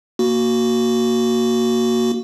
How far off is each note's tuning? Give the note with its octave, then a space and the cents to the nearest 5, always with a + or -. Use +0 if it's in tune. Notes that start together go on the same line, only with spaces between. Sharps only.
A#3 +0 F#4 +0